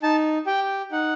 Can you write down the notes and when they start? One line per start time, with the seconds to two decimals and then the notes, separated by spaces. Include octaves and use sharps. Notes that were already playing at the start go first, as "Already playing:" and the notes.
0.03 D#4 A5
0.47 G4 G5
0.92 D#4 F#5